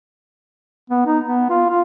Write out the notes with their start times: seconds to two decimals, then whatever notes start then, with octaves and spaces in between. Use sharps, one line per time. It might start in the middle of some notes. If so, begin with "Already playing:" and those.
0.90 B3
1.06 D#4
1.24 B3
1.50 F4
1.69 F4